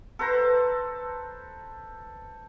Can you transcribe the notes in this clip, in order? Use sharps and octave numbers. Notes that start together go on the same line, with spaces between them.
A4 B4 C5 A#5